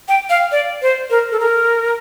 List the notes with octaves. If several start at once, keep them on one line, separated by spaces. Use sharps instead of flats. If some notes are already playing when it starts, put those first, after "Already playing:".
G5
F5
D5
C5
A#4
A4
A#4